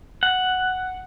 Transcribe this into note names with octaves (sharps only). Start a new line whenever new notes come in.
F#5